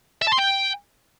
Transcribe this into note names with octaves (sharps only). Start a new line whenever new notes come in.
E5
A5
C6
G5